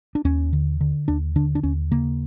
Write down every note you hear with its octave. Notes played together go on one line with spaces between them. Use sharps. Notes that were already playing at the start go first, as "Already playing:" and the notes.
D4
D#2 C#4
D3
D3
D#2 D4
D3 D4
D4
D#2 C#4
C#3 A#3